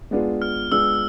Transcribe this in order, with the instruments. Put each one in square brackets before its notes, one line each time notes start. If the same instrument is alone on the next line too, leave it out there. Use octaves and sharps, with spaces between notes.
[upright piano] G#3 B3 D4 F4 G#4
[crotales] F6
[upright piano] G#3 B3 D4 F4 G#4 [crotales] E6